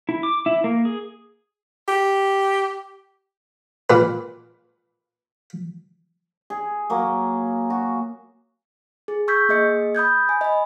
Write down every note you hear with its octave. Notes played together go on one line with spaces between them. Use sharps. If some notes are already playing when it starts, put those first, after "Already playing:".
E4
D6
E4
A#3
G#4
G4
A#2 B4
G#4
F#3 A#3
F#4
G#4
C#6 E6 G6 G#6 B6
A#3 G#4 D#5 C#7
B5 D#6 G6 G#6
G#5
D#5 B5